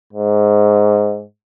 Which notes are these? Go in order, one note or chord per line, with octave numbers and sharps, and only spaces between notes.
G#2